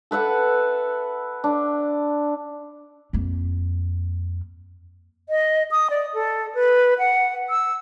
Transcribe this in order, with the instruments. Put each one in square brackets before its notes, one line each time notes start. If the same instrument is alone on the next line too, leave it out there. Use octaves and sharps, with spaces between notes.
[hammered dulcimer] A4 B4 E5 F#5
D4
[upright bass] F2 A#3
[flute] D#5
D#6
D5
A4
B4
F#5
E6